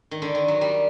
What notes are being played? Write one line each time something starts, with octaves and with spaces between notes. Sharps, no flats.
D#3
D3
D#3
F#3
G3